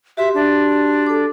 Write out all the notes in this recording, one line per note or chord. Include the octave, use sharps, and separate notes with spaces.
F#4 G4 E5 C6
D4
A4 D6